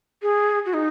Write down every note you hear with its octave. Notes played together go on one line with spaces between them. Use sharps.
G#4
F#4
D#4